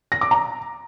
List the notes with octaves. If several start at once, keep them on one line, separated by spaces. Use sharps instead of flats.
A#6
D6
A#5